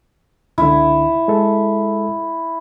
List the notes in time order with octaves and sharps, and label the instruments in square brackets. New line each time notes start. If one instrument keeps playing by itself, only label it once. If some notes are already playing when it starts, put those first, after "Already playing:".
[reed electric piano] C#2 D3 [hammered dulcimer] E4
[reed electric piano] G#3 A4